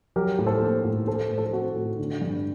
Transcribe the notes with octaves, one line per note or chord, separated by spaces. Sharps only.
F#3 G4 A#4
A2
A4 C5
A#3
A2
A3 A4 C5
A2
A4 C5
C4 F#4 A4
A2
D3
G2